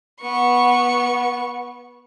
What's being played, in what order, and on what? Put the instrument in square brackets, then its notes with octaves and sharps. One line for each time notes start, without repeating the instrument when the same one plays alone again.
[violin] B3 C#6